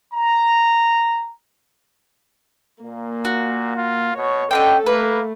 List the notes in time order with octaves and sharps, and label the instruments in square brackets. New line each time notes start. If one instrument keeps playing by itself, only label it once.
[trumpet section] A#5
[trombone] A#2 [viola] A#3
[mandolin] F#4
[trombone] F4
[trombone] B2 [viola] C#5
[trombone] D3 [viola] C#4 A4 [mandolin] D#5 F5 G5
[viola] A3 [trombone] A#3 [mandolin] B4